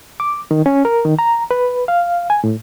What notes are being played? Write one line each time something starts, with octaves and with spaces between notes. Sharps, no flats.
D6
D#3
C#4
A#4
D#3
A#5
B4
F5
G#5
A2